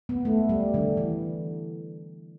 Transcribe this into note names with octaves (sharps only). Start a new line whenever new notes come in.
B3
A3
G3
D3
E3